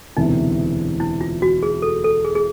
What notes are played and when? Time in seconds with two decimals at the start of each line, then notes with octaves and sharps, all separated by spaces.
0.17 E1 D2 C3 E3 D#4
1.00 E4
1.21 F4
1.42 F#4
1.63 G#4
1.82 A4
2.04 A4
2.25 G#4
2.35 G#4